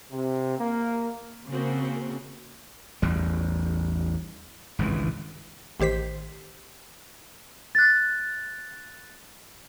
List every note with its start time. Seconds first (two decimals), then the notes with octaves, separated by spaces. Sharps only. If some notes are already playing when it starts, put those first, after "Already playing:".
0.12 C3
0.58 A#3
1.50 C#3 A#3 C4 F#4
3.02 A1 E2 G3
4.79 G#1 C#2 G2 E3
5.80 A1 D#3 G4 C5 B6
7.75 F#6 A6